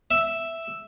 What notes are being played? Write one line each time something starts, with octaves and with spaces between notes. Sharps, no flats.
E5